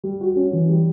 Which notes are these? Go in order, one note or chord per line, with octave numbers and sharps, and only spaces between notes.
G3
F#4
C#4
E3
G3